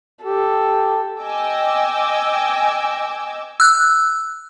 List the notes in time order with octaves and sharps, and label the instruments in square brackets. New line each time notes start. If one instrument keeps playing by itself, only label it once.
[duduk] G4 [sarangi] A4
[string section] D#5 G5 G#5 D6 E6
[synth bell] E6 F#6